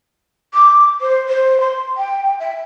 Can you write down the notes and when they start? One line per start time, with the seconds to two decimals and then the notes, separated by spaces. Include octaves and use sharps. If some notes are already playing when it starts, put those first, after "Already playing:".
0.54 D6
1.01 C5
1.29 C5
1.60 C6
1.97 G5
2.40 E5